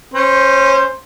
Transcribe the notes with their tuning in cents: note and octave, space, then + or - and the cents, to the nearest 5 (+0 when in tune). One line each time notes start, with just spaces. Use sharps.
C#4 -20 C5 +0